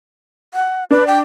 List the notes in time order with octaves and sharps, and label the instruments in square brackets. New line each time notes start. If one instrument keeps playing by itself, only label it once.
[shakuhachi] F#5
[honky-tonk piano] D4 [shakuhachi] B4
[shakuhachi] G5